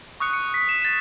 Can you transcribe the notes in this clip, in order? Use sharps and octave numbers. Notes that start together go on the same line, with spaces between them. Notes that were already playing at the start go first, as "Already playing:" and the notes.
C#6 D#6 F#6 C#7
C#7
B6
E7
A6 E7